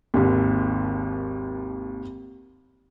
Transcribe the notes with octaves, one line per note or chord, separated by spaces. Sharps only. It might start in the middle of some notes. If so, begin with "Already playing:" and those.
G#1 D#2